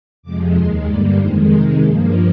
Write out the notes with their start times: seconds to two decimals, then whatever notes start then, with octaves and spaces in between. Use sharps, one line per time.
0.22 F2 C3 F3 G#3 D6
0.54 D#2 D#3 G#3 C6
0.86 G2 D3 G3 A#3 D5
1.18 F2 D#3 G#3 C5
1.50 C3 D#3 G#3 A#4
1.81 G2 F3 A#3 G#4